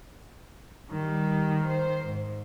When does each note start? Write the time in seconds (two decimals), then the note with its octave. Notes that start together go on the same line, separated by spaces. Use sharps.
0.91 D#3 G3
1.66 C5
2.06 G#2